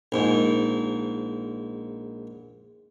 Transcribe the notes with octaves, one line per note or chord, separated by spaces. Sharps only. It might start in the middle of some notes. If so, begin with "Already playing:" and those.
A#1 G#2